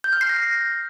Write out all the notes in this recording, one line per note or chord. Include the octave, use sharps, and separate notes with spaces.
G6
F6
C7
A#6